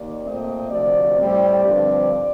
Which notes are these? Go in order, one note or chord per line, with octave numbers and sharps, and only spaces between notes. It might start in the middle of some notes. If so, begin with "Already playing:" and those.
Already playing: D#2 D5
A#2 A3 C4 D#5
D2 C3 F3 D5
A2 G3 C4 D5
G2 D3 F3 C4